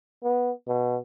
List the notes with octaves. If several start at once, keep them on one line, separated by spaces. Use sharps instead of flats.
B3
B2